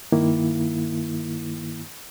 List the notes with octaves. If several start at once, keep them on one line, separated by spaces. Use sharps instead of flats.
G2 D#3 A#3 E4